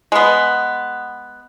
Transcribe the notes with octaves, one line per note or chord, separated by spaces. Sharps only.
G#3 B3